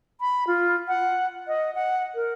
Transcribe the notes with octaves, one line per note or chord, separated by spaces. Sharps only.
B5
F4
F#5
D#5
F#5
A#4